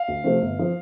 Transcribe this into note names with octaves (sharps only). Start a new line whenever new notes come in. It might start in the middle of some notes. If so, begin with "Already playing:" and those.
Already playing: F5
D2
C3 F3 A3 C4
G1
F3 C4